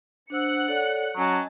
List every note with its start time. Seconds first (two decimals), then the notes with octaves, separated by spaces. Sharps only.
0.30 D4 C5 F#5 E6 F#6 C#7
0.68 A4 C#5 D5
1.17 F#3 C#4 D#5 G#5 A5